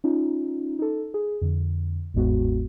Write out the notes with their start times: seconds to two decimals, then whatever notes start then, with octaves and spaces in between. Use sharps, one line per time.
0.04 C#4 D#4 F4
0.79 D#4 A4
1.14 G#4
1.42 F2 D3
2.14 G1 D#2 G#2 G#3 B3 F#4